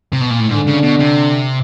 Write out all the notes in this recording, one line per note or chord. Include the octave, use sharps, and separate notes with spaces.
C3
B2
A#2
A2
G#2 D3 D4
C#3
B2
C3